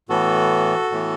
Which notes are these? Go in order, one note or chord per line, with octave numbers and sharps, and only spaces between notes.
A2 E3 B3 F#4 A4
A2 E3 B3